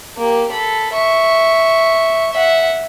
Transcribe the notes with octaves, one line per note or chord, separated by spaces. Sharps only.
A#3 G4
A4 B5
E5 C#6
E5 F#5